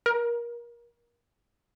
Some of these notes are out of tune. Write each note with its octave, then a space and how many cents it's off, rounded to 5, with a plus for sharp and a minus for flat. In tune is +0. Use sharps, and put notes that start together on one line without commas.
A#4 +25